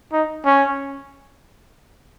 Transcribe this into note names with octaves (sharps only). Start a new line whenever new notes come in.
D#4
C#4